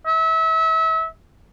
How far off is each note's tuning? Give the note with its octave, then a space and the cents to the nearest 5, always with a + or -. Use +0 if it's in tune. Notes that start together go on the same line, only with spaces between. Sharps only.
E5 -30